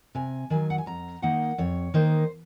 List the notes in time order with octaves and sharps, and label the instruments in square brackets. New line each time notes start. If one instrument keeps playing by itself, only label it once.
[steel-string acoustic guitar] C3 G#5
D#3 F#3 G#5
F#5
G#5
F2 A#5
D#3 A#3 D#4 F#5
F2 C#5
D#3 A#3 D#4 C5